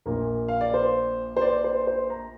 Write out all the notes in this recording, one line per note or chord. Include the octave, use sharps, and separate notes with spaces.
A#1 A#2 A#3 A#4
F5
D5
C5
C5
D5
C5
C5
A#5